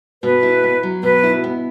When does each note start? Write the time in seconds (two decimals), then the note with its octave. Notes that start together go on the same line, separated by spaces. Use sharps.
0.23 B2 B4
0.43 E4
0.64 B3
0.83 F#3
1.03 B2 B4
1.23 E4
1.44 B3